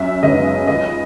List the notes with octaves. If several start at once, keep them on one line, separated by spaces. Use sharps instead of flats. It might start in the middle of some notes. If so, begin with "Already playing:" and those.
Already playing: F#2 E5
C#3 G#3 B3 D#4 D#5
C#2 D#5